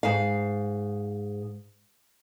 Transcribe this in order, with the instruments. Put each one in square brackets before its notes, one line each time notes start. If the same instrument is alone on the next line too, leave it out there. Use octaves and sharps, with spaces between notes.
[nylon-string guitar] G#2 F5